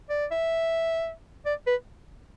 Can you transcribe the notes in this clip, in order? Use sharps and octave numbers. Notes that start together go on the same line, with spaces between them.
D5
E5
D5
B4